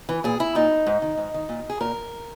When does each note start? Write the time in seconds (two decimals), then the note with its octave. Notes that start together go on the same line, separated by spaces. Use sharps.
0.09 E3
0.24 A#2 G#4
0.40 E4
0.55 A#2 D#4
0.87 G#2
1.02 D#3
1.17 G#2
1.34 D#3
1.49 A#2
1.70 G#4
1.81 A#2 A#4